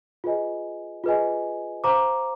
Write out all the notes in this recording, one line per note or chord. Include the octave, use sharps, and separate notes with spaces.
F4 G#4 B4 D#5 G#5
F4 G#4 B4 D#5 G#5
C5 F5 A#5 D6